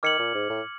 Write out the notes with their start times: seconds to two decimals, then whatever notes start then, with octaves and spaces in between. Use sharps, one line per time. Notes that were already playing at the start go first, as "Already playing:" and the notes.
0.03 D#3 D6 F6 G#6 C#7 F#7
0.19 A#2
0.35 G#2
0.50 A2